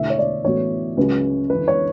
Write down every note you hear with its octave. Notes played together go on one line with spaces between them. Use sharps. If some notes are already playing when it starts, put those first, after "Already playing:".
Already playing: E1 E2 D3 A3 E4 E5
C#5
D5
A1 A2 E3 B3 F#4 C#5
C#2 C#3 F#3
G1 F#2 E3 B4
C#5